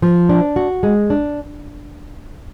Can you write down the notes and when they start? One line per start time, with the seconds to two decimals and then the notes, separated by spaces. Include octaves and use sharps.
0.02 F3
0.29 D4
0.56 F#4
0.83 G#3
1.10 D4